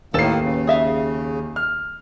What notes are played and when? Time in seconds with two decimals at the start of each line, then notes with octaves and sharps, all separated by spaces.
0.14 D#2 A2 D#3 A#3 A4 B4 A5 C7
0.41 C#3
0.67 G#4 E5 F5
1.56 F6